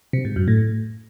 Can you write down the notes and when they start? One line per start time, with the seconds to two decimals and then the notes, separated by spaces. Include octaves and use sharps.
0.13 C3
0.25 G#2
0.36 F#2
0.48 A2